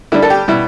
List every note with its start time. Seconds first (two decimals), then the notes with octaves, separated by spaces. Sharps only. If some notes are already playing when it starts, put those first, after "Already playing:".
0.12 D3 G3 D4 E4
0.23 A4
0.30 G4
0.48 B2 G3 E4